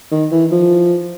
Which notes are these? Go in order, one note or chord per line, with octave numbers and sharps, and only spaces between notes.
D#3
E3
F3